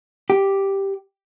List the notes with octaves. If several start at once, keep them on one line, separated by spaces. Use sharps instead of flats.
G4